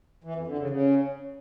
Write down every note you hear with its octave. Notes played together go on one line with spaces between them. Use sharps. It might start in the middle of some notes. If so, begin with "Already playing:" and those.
E3
F2
D3
C#3
C#3